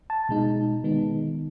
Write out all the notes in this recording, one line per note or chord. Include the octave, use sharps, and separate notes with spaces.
A5
B2 G#3 D#4
D#3 G#3 B3 D#4